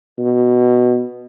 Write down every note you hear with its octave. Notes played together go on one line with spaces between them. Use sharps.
B2